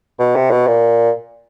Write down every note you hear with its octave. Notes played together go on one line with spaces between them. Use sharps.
B2
C3
B2
A#2